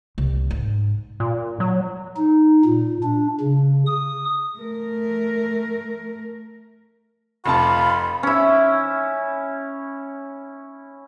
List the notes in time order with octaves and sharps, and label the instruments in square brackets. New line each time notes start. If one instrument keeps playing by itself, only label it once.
[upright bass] C2
G#2
[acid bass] A#2
F#3
[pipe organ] D#4
A#2
D4
C#3
D#6
[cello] A3 A#4
[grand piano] F1 C3 A5 [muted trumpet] F4 [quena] B5
[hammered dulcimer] C#4 E4